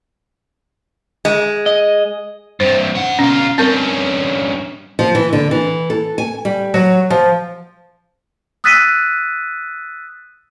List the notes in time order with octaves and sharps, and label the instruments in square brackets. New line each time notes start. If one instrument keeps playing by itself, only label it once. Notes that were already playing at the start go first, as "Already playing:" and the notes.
[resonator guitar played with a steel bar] G#3
[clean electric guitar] D#5
[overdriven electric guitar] G2 C3 [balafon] C5
[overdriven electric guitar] C#4 F#5
[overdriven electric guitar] B2 F4 [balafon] C#4
[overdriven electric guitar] G2 C#4 [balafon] C4 A#4
[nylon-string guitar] F3
E3
D3
E3
A4
G#5
G3
F#3
F3
[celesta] D#6 E6 F#6 A6 B6 D#7